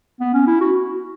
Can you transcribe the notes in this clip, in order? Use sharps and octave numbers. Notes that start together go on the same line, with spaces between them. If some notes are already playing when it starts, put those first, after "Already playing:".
B3
C#4
E4
F#4